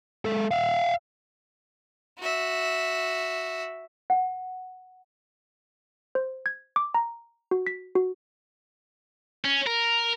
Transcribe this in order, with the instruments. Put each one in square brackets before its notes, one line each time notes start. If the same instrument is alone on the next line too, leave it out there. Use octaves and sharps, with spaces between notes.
[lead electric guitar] G#3 A4
E5 F5
[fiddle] F#4 E5
[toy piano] F#5
[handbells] C5
G#6
D6
A#5
F#4
B6
F#4
[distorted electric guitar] C#4
A#4